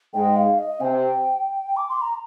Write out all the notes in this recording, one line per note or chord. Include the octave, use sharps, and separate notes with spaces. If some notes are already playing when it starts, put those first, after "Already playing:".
G#2 G#3 G5
F5
D#5
C3 C4 G5 G#5
D6
C6
A#5